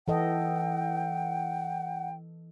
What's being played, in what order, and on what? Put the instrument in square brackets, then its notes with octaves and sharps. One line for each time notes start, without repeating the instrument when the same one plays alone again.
[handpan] E3 A4 D#5 [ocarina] F#5 [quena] G5